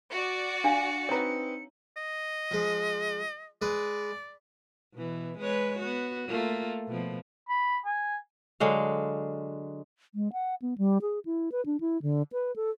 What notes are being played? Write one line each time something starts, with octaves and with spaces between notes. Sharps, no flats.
F#4 D5 C#7
D4 F5 G#5
C4 D#4 B4 C#5 A#5
D#5
F3 G#3
G#3 B4 D5
B2 E3
G#3 B4 C#5
B3 F#4
A3 A#3 F4
B2 F3
B5
G#5
D3 F#3 G#3 F5
G#3
F#5
B3
G3
G#4
E4
B4
D4
E4
D3
B4
A4